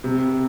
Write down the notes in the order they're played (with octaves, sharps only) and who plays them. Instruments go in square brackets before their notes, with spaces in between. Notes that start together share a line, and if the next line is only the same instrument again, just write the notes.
[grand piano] C3